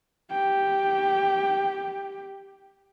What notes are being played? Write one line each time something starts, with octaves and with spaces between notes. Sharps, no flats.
G4 G5